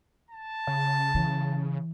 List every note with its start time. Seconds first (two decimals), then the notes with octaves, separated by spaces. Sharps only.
0.31 A5
0.67 C#3
1.14 E3